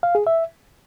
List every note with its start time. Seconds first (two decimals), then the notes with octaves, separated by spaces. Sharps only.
0.03 F5
0.15 G#4
0.27 E5